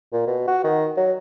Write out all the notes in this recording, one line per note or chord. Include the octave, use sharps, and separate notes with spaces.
A#2
B2
F#4
D#3
F#3